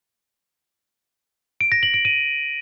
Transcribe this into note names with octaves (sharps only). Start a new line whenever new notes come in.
D7
A#6
F#7
D7
D#7